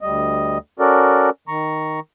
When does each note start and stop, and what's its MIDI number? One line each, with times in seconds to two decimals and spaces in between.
0.01 0.58 38
0.01 0.58 55
0.01 0.58 75
0.79 1.30 61
0.79 1.30 66
0.79 1.30 69
0.79 1.30 70
0.79 1.30 74
1.48 2.00 51
1.48 2.00 82
1.48 2.00 85